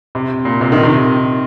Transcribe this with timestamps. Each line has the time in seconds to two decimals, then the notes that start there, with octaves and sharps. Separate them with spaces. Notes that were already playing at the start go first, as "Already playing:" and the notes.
0.15 C3
0.45 A#2
0.61 C3
0.72 D#3
0.83 C3